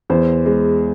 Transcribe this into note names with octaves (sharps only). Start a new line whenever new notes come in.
E2 C5
G#3